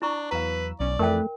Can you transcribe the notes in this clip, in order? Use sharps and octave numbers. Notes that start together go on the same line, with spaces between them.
D4 E4 A#5 C#6
E2 F#3 B4 F5 A#5 E6
B1 C#4 D5
F2 E3 A3 A#4 B4 G5